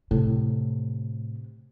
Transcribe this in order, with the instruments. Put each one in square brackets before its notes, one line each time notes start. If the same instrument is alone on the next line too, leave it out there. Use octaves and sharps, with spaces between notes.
[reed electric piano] A2 [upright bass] C3